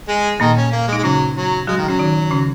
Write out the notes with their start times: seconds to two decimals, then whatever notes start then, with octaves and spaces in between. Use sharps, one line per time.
0.08 G#3 G#4
0.40 A#2 D#3 A#3 D#4
0.57 C#4
0.72 A#3
0.88 G#3
0.93 D#4
0.98 G#3
1.03 C#3 F#3 C#4
1.36 F#3
1.67 F#3 G#3 F#4
1.78 D#3
1.88 F#3 C#4
1.99 D#3 D#4
2.31 C#3 C#4